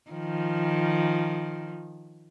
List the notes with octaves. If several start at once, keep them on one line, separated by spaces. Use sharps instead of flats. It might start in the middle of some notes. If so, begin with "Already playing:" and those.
D#3 F3